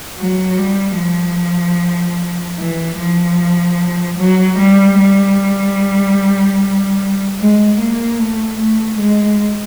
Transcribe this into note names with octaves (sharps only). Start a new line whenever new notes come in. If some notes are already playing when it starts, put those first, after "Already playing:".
F#3
G3
F3
E3
F3
F#3
G3
G3
G#3
A#3
A3
A3
G#3